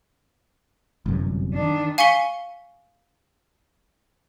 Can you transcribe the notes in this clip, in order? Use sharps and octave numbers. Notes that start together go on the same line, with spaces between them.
G1 C2 F#2
D#3 D4
F5 G#5 C#6 B6 C#7 G7